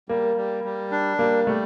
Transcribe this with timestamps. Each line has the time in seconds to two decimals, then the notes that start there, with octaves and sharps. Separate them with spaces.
0.09 G3 A#3
0.37 G3
0.64 G3
0.91 D4
1.19 G3 A#3
1.47 G3 A3